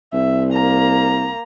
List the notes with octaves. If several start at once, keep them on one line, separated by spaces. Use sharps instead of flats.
C2 E5
A#3 A#5